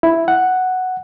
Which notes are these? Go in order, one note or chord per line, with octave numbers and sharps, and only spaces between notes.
E4
F#5